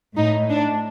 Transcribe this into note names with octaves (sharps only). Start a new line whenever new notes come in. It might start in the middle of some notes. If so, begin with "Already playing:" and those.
A2 D#4
D4